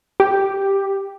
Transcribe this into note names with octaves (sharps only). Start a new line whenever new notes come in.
G4